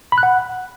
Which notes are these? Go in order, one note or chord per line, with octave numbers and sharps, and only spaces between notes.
B5
F#6
F#5